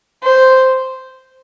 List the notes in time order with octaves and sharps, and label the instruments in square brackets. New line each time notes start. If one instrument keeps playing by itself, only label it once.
[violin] C5